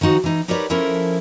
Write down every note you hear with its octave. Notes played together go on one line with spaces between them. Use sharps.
D#3 F3 D#4 F#4 C5
E3 D#4
D#4 G4 A#4 B4 C#5 D5
F3 C#4 E4 A4 A#4 E5